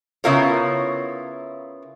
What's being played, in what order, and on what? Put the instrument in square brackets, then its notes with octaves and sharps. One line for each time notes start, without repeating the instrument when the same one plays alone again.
[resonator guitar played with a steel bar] C#3 B3 E4 F4 A#4 C#5